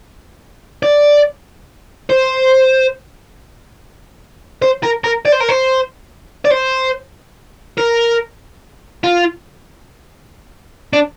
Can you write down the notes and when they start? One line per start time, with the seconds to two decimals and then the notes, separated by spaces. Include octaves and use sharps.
0.83 D5
2.10 C5
4.62 C5
4.83 A#4
5.04 A#4
5.25 D5
5.32 C5
5.41 A#4
5.49 C5
6.45 D5
6.52 C5
7.78 A#4
9.04 F4
10.93 D4